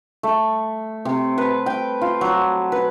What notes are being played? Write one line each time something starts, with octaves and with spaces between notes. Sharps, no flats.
A3
C3
B4
G5
F4
F#3
B4